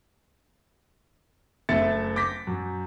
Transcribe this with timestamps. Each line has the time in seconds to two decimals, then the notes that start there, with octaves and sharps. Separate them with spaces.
1.69 F#1 A3 E5 A6 C#7
2.16 D6 G6 A#6 B6
2.47 F#2